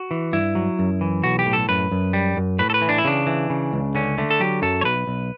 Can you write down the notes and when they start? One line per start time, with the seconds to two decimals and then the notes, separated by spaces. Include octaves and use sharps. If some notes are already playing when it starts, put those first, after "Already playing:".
Already playing: F#4
0.11 E3
0.33 G2 E4
0.55 F#3
0.79 F#2
1.01 E3
1.24 B1 F#4
1.39 G4
1.46 A2
1.53 A4
1.69 F#2 B4
1.92 F#2
2.13 G3
2.37 F#2
2.59 A2 B4
2.70 A4
2.74 B4
2.82 E3
2.89 D4
2.98 E4
3.05 C#3 D4
3.27 E3
3.50 C#3
3.73 C#2
3.95 D3 C#4
4.18 D3 A3
4.31 A4
4.40 F#3 G4
4.62 F#2 A4
4.81 C#5
4.85 B1 B4
5.07 B1